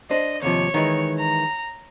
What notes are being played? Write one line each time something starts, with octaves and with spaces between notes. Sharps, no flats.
D4 C5 D#5
D#2 C3 F3 C#5
D#3 E3 G#3
A#5